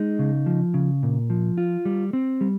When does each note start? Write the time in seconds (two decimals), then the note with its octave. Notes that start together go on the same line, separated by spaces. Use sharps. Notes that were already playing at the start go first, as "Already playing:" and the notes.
Already playing: G#3 D#4
0.19 C#3
0.46 F3
0.74 C#3
1.03 A#2
1.30 F3
1.58 F4
1.85 G3
2.13 C4
2.41 G3